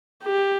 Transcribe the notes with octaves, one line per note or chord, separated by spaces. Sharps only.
G4